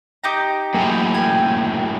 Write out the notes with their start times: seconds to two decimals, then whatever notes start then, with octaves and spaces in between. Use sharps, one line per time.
0.24 D#4 G4 A#5
0.74 F#2 A2 A#3 G#4 G5
1.14 G#5